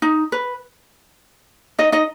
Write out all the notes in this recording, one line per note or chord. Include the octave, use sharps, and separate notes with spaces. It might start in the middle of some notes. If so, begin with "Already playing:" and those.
D#4
B4
D#4 D#5
D#4 D#5